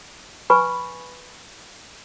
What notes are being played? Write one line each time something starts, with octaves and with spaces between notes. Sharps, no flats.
B4 G#5 B5 C#6